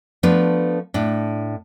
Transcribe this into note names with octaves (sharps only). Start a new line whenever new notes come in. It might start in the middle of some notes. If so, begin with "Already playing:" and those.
F3 A3 B3 D4 B4
A2 D4